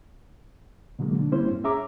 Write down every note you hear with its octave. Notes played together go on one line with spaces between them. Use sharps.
B2 D3 F#3 G#3 A#3
D3 D4
G3 A#3 C4 C#4 E4 C5
G2
C#4 G#4 E5 A#5 D6